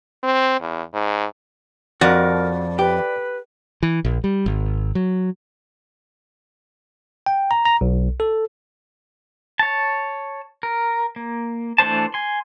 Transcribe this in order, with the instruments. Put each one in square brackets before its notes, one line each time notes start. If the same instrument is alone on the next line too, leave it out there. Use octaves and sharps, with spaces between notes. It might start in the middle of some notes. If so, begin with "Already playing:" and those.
[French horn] C4
E2
G#2
[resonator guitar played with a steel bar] F2 [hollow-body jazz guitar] F#4 [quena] A#4 [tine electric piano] D5 A6
[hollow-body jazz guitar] G4 [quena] B4
[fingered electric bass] E3
A#1
G3
G#1
F#3
[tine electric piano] G5
A#5
A#5
B1
A4
[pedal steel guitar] C#5 A5
A#4
A#3
E3 A3 D4 C5 A5
G#5 C6